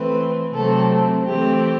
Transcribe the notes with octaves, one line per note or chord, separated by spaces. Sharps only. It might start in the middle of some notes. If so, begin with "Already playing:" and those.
Already playing: E3 A3 C4 B4
C3 F#3 A3 C4 A4
E3 A3 C4 G4